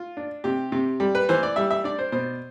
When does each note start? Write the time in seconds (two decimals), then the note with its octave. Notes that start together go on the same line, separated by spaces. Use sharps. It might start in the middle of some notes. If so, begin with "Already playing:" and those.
Already playing: F4
0.17 D4
0.44 C3 G4
0.72 C3
1.00 G3
1.15 B4
1.29 E3 C5
1.43 D5
1.56 G3 E5
1.71 E5
1.84 D4 D5
1.99 C5
2.12 B2 C5